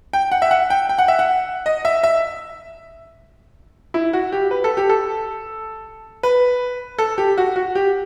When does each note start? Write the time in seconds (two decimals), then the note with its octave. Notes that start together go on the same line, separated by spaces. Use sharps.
0.13 G5
0.32 F#5
0.42 E5
0.51 F#5
0.70 G5
0.89 G5
0.98 F#5
1.08 E5
1.19 F#5
1.66 D#5
1.85 E5
2.03 E5
3.94 E4
4.13 F#4
4.32 G4
4.51 B4
4.64 A4
4.77 G4
4.89 A4
6.23 B4
6.98 A4
7.18 G4
7.38 F#4
7.56 F#4
7.75 G4